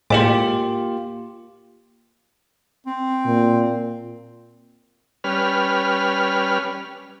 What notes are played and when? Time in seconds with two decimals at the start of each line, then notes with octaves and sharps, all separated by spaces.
0.10 A2 G#3 A#3 F4 G4 D6
2.86 C4
3.26 A#2
5.24 G3 C#4 B4 F6